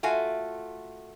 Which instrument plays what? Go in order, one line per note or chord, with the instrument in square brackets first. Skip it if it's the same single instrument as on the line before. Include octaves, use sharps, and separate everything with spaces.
[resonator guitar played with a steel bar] A3 F4 F#4 G#5